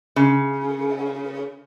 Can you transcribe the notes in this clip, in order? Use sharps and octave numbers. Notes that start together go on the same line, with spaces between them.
C#3